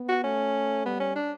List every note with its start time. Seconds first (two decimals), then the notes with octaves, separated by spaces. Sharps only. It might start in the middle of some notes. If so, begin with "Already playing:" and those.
Already playing: B3
0.09 F#4
0.24 A3 C#4
0.85 G3 B3
1.00 C#4
1.16 D4